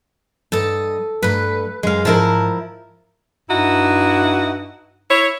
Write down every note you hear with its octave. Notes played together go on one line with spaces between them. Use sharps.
G2 A4 D#5 A5
G2 A3 B4
F#2 G#3 F5
G#2 F3 E4 A#4 A5
G2 D#4 E4 F#4
E4 C#5